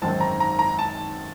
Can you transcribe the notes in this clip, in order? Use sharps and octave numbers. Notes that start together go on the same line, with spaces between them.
G#1 F#2 D#3 G#3 C4 A5
A#5
A#5
A#5
A5